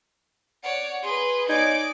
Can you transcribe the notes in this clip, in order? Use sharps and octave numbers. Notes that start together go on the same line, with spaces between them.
C#5 D5 F#5
G#4 B4 C6
D#4 C#5 D5 G#5 D6